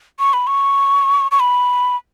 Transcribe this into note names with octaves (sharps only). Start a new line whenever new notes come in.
C#6
B5
C#6
C#6
B5